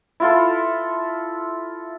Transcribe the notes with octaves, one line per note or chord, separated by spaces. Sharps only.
E4 F4 A4